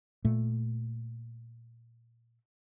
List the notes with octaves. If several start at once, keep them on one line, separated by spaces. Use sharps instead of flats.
A#2 A3